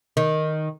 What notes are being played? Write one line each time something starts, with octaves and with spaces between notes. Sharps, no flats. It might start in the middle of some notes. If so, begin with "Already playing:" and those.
D#3